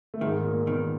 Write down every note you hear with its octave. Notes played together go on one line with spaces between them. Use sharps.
A3
G#2 D#3 G#3
A#2 A#3
B2 D#3 B3